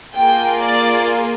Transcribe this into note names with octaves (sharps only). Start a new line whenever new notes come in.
A#3 F4 G#4 G5
D5